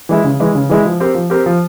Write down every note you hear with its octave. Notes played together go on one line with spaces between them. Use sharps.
E3 G#3 E4
C#3
E3 G#3 E4
C#3
E3 G#3 E4
F3
C4 G4 A#4
F3
C4 G4 A#4
F3